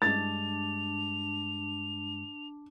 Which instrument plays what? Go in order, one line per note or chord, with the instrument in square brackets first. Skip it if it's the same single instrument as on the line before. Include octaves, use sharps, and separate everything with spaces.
[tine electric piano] G2 G#3 [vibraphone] D4 A5 D6 [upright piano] A6 [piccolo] F7